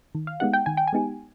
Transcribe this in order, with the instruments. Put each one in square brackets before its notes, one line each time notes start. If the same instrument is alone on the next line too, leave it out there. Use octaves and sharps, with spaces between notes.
[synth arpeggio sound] D#3
[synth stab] F5
[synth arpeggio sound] G#3 B3 D#4 G4 [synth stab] F#5
[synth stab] G5
[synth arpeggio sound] D#3 [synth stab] G#5
[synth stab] G5
G#5
[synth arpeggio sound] G#3 B3 D#4 G4